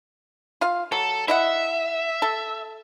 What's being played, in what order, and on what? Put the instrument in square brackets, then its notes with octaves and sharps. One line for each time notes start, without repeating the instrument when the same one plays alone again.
[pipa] F4 F5
[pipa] F#3 [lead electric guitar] A4
[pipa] E4 D#5 F#5 [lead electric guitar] E5
[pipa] A4